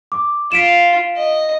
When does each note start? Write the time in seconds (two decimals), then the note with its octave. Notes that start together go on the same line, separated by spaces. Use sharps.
0.12 D6
0.52 F4 B6 D7 E7
1.17 D#5